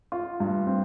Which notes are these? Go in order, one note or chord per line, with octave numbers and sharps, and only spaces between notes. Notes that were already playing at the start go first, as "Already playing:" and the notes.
F4
G2
C4